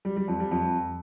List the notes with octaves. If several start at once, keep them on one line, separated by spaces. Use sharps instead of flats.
G3
G3
F2
G3
F2